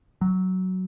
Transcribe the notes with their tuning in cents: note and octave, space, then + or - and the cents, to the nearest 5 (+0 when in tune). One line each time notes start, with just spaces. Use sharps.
F#3 +10